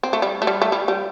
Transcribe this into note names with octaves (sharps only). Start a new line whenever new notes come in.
C4
A3
G3
A3
G3
A3
G3
G3